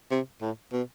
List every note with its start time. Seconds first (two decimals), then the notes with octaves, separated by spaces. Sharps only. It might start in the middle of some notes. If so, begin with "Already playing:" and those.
0.11 C3
0.41 A2
0.72 B2